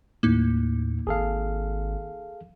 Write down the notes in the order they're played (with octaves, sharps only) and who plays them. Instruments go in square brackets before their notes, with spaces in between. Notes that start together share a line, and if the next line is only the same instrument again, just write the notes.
[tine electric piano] D#2 A2 [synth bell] A#3 D#4
[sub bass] G#1 [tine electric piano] G#4 A4 F5